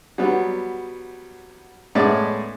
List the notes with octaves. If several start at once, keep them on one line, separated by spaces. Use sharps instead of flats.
F#3 G3 B3
A2 G#3 B3 C#4 D5 E5